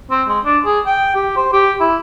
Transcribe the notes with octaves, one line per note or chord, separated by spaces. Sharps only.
C4
G#3
D4
G#4
G5
G4
C5
G4
E4